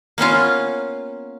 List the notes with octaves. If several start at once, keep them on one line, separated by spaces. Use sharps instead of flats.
A#3 B3 C#4 F4